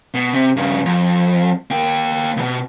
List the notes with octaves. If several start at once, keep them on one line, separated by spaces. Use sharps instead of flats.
B2
C3
G2 C#3
F2
A#3 G5
C#2 B2